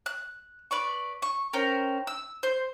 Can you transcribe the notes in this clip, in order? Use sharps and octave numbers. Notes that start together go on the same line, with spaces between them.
F#6
B4 D5 C#6
C#6
C#4 A#4 C5 G5
E6
C5